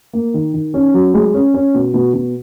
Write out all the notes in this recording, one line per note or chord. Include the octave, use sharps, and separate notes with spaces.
A#3
D#3
D#3
C#4
F#3
G#3
C#4
C#4
B2
B2
B2